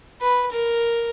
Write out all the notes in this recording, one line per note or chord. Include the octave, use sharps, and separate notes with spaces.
B4
A#4